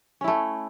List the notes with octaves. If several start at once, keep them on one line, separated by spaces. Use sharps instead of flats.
A3 C#4 E4